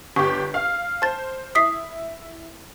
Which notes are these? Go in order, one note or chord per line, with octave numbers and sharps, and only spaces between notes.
G1 G4 C#6
F5 F6
C5 A5 A6
E4 D#6 B6 C7